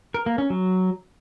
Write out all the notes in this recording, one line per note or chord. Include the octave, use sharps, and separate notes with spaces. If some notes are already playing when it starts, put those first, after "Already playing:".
A#4
A#3
C#4
F#3